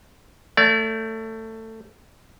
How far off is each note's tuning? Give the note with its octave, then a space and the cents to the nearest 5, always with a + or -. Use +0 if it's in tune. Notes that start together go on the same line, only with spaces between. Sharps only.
A3 +20 D5 -35